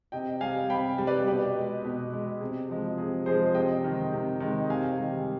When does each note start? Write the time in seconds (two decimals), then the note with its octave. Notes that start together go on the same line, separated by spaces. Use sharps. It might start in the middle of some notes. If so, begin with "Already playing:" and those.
0.12 C3 D#5 G5
0.41 G3 F5 G#5
0.70 C3 G5 B5
0.98 G3
1.07 B4 D5
1.27 B2 G4 B4
1.56 G#3
1.85 B2
2.13 G#3
2.41 C3 G#4
2.70 F3 G#3
2.98 C3 G#4
3.26 F3 G#3 G#4 C5
3.55 C3 D#5 G5
3.84 D#3 G#3
4.13 C3
4.40 D#3 G#3
4.69 C3 F5 G#5
4.99 D#3 G3